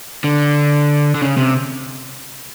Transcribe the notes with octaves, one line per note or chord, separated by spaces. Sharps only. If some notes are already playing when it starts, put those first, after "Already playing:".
D3
D3
C#3
C3